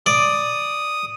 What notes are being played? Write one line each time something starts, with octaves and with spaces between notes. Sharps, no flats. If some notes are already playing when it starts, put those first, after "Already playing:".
D5 D#6